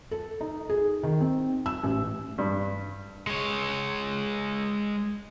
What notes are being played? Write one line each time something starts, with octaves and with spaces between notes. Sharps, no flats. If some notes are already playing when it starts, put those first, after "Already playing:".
A4
D#4
G#4
D#3
C4
E6
A1
G2
G#3 C#5